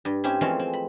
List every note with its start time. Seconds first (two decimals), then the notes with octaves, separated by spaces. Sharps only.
0.05 G2
0.24 C4 C#4 E4 G4
0.41 E3 F3 G#3 A3 C4 C#4
0.59 C4
0.73 B5